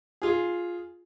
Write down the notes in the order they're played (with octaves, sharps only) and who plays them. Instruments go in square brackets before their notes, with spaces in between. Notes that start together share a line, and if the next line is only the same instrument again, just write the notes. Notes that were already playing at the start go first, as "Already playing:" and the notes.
[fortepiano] F4 G#4